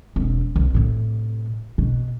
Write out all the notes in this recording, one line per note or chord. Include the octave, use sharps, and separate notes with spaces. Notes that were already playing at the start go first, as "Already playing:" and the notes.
E1 C4
C2
A2 C3
B2